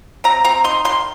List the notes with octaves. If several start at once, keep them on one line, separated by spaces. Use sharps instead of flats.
C4 A#5
C4 A#5
D#4 C6
D#3 C6